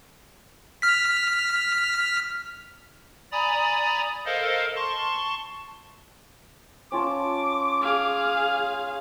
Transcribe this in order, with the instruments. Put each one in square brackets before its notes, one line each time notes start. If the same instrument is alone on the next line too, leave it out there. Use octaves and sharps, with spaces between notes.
[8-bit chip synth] F6 B6
[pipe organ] D5 G#5 A#5 B5 D#6 A6
A4 A#4 C5 D#5 F5
A5 C6 C#6
[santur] C#4 F4 A5 [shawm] D6
[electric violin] G#4 F5